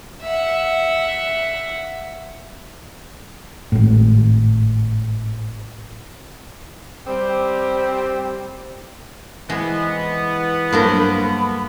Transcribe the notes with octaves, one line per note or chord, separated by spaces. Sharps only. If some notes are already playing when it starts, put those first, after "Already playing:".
E5 F#5
G#1 A2
G3 C4 G4
E3 G#3 B3 C4
G2 F#3 A#3 A4 A#4 C5 B5